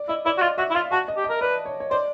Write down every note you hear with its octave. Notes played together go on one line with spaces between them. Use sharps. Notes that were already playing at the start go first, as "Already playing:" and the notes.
Already playing: D5
E4 D#5
E4 D5
F#4
F4 D#5
F#4 E5
E4
F4 F5
F#4 A5
D#5
G4
D#5
A#4
B4 D5
C#5
C#5
C5 D5